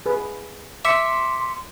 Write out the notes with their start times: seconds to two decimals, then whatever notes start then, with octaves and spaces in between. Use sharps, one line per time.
0.06 G#4 B4
0.85 E5 C6 D6 B6 C#7